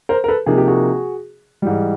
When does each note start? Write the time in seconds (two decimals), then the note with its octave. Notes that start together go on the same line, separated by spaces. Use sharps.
0.09 A#4 C5
0.24 A#4
0.28 A4 B4
0.46 C3 F3 A#3 D#4 G#4
0.58 G4
0.68 F#4 G#4
1.62 G#2 E3 G3